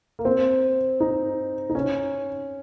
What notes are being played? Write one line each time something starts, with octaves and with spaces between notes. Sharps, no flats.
A#3
C4
D#4
D#4
C#4